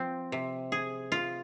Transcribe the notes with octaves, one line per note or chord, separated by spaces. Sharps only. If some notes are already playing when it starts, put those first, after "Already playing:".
Already playing: F3 C4
C3
G#4
F4